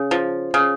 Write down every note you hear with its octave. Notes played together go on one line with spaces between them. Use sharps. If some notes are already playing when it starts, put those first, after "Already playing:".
Already playing: C#3
F3
C#3